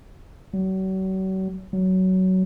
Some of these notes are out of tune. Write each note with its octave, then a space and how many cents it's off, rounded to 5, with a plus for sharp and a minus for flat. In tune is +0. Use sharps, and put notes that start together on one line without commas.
F#3 +40
F#3 +15